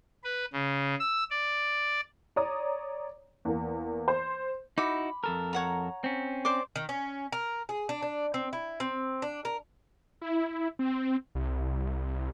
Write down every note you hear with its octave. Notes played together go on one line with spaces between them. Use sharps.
B4
C#3
E6
D5
C#5 D5 A#5 D#6
E2 A#3
C5
D#4 E4 F#4 B5 D6
F2 A4 A#4
C#5 F#5 A#5
C4 C#4
C5 D5 D6
D#3
C#4
A#4
G#4
D4
D4
C4
E4
C4
D4
A#4
E4
C4
C2